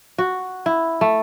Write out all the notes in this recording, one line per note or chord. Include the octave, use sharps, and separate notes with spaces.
F#4
E4
A3